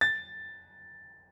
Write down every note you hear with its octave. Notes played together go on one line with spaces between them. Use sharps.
A6